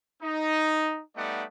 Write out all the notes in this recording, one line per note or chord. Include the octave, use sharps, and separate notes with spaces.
D#4
G3 A3 B3 D#4 D5 F#5